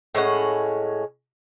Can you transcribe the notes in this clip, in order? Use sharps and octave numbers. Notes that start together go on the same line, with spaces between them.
A2 G#3 C#4 F#5